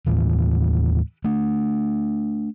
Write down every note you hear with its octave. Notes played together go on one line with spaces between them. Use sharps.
D#2 A2 E3
A3 D4